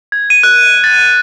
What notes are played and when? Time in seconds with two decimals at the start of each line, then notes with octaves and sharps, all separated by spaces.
0.12 G#6
0.30 D#7
0.43 F#6
0.84 A6